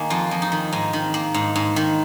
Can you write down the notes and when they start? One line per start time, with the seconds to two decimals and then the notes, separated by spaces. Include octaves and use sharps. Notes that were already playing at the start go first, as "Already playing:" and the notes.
Already playing: D#3 A#3 G#4
0.10 F2 F4
0.31 F2
0.42 D#4
0.52 D#3
0.73 G#2 D#5
0.93 D#3
1.14 A#3
1.34 G#2
1.56 G#2
1.76 D#3